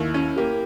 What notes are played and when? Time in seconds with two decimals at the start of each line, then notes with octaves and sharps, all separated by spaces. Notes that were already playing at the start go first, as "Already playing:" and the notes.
Already playing: D#2 E4
0.14 C#4
0.36 A#3 G4